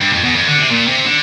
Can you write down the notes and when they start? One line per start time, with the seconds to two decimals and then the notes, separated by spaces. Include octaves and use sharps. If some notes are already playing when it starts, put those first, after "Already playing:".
0.01 G2
0.13 F2
0.25 E2
0.35 F2
0.47 D3
0.59 C3
0.71 A#2
0.88 C3
1.05 D3